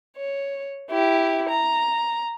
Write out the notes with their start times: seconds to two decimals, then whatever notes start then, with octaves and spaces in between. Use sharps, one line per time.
0.17 C#5
0.91 E4 G4
1.49 A#5